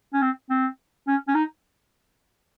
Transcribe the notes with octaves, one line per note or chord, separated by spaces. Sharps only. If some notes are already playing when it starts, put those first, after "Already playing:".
C#4
C4
C4
C#4
C#4
D#4